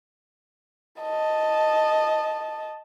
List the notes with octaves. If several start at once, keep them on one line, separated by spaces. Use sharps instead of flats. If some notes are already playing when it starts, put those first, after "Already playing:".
D#5 A5